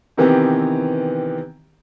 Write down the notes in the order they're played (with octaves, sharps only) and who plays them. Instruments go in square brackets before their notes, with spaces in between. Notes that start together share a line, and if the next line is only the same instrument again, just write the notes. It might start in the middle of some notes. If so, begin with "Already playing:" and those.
[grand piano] C3 D#3 E3 B3 C4 G4